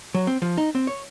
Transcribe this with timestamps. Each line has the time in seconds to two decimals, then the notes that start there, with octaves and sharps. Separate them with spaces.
0.15 F#3
0.27 C4
0.42 F3
0.58 D#4
0.75 C4
0.87 C#5